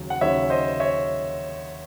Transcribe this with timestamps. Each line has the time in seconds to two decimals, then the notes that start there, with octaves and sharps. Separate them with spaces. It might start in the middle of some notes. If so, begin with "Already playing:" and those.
Already playing: D#2 C#3 F#3
0.10 F#5
0.21 D#2 C#3 F#3 C#5 E5
0.50 C5 D#5
0.80 C#5 E5